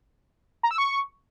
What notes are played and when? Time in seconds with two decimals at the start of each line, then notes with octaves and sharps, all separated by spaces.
0.63 A#5
0.71 E6
0.78 C#6